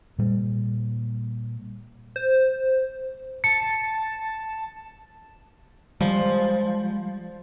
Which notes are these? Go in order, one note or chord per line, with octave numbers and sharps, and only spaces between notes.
A#2 G3 A#3
C5
A5 C#7
F3 G3 G#3